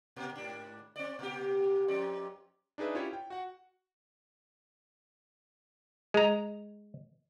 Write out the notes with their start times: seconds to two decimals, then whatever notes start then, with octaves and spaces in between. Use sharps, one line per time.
0.16 A#2
0.35 G#2 D4
0.96 C4 D5
1.19 A#2 G4
1.88 F2 C4 D5
2.78 D4 D#4 G#4 B4 E5
2.95 C#4 E4 F4 G4 C#5
3.13 G5
3.30 F#4 F#5
6.14 G#3 A#5